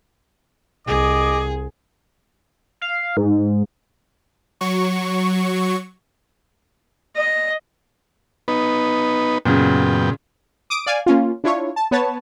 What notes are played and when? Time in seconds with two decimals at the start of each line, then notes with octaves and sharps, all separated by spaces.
0.87 C2 G#4 D#5 D6
2.81 F5
3.17 G#2
4.61 F#3 C#6
7.16 D#5
8.48 B3 D#4 B4
9.45 F#2 A#2 C#3 B3 G5
10.70 D6 D#6 D7
10.86 D5 F5 G#5
11.06 A#3 C#4 F4
11.44 D4 E4 F4 C#5
11.76 A5
11.91 B3 B4 C#5 A5